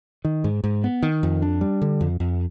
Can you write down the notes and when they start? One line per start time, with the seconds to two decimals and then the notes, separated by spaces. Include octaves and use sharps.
0.25 D#3
0.44 G#2
0.64 G#2
0.84 B3
1.03 D#3
1.23 F2
1.42 D4
1.61 G3
1.82 D3
2.01 F2
2.20 F2